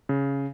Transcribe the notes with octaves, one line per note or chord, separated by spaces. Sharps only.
C#3